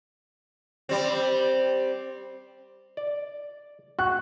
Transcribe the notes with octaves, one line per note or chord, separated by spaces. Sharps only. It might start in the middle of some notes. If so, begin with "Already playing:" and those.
G3 C4
D5
F#4 F#6